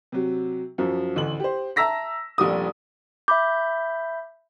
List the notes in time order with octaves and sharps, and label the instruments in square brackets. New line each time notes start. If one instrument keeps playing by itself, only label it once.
[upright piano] C3 F#3
F#2 F3 F#3
A1 D2 F#7
G4 C5
E5 A5 A#5 E6 A#6 B6
F1 A#1 G3 D#6
[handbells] E5 B5 G6 [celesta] D6